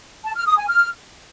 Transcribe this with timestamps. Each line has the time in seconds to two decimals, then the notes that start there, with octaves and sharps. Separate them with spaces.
0.25 A5
0.36 F6
0.47 D#6
0.57 G#5
0.68 F6